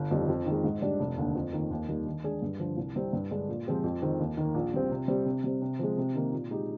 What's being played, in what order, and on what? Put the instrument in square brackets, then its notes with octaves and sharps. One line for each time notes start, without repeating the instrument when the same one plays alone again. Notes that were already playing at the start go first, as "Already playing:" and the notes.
Already playing: [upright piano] G1
F2 D#3 G3
F2
D#3 G#3
G#2
G3 D4
F1
D#2 D3
F2
D#3 A#3
D#2
D#3 G3 A#3 D#4
D#3
G#3 D4 G#4
G2
D3 F3
C2
C3 G3 C4
G2
D3 G#3 D4
A#2
F3 G#3 C4 G4
F2
D#3 G#3 C4
D#2
D#3 A#3
A#1
A#2 G3 C4
C3
G3 C4
C3
G3 C4
C3
F3 G#3
C3
D#3 A#3 D#4
A#2
G#3 D#4 G4